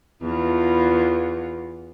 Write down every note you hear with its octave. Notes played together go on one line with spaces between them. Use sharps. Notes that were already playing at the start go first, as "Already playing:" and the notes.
E2 F4